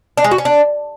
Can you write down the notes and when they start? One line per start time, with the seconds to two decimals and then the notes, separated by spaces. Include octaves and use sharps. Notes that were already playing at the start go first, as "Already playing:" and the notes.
0.17 D4
0.24 G#3
0.31 F#4
0.38 C#4
0.45 D4